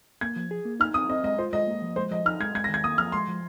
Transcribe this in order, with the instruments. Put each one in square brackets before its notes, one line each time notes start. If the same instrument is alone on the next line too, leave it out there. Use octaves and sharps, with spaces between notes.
[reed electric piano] A#3 [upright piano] G#6
[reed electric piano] F3
G#4
A#3
[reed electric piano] D#4 [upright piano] F6
[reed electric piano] C4 [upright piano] D#6
[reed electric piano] C4 [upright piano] D#5
[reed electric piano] G#3 [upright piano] D#5
[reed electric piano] F4 [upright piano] C5
[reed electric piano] G#3 [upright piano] D#5
[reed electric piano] A#3
F3
[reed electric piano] G#3 [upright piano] C5
[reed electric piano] F3 [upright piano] D#5
[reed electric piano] D#4 [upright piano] F6
[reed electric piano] G#3 [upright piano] G#6
[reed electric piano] G#3 [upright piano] G#6
[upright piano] A#6
[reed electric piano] D#3
[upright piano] G#6
[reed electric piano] A#3 [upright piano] D#6
[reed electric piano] F3 [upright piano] F6
[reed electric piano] G#3 [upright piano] C6
[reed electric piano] F3